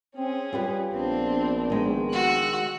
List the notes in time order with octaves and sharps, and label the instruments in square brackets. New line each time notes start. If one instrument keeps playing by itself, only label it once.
[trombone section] C4 [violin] C#4 G#4
[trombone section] G3 [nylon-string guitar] F4 G4 B4
[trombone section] A#1 B3 [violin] C4 D4
[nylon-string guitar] D#3 G#3
[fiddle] F#4 [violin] E6 F#6